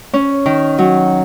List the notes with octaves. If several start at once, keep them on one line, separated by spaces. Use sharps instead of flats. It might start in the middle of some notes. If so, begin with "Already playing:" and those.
C#4
D#3
F#3